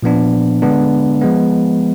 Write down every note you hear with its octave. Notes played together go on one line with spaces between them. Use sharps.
A#2 F3 B3 D4
D3 G#3 B3 D4
F3 G#3 B3